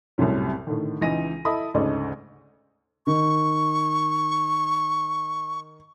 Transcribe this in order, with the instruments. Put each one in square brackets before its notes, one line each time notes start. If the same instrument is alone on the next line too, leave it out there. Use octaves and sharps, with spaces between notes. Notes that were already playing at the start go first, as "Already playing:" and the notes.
[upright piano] C2 F#2 A2 C3 F#3
A2 D3 D#3
C#2 E3 D#4 A#6 D#7
E4 A4 D#5 A5 B5 D#6
D2 G#2 C#3 A4 D5 D#5
[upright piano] D#3 [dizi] C#6